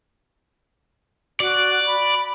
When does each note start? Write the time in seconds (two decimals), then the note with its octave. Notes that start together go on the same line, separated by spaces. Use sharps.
1.40 F#4 D5
1.86 B5